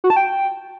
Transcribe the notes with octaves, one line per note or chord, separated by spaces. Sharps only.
F#4
A5
G5